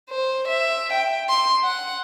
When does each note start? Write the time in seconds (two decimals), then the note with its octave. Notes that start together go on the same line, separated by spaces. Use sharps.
0.10 C5
0.48 E5
0.93 G5
1.29 C6
1.64 F#5